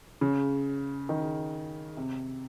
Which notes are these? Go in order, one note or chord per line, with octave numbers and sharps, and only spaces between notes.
C#3
D#3
C3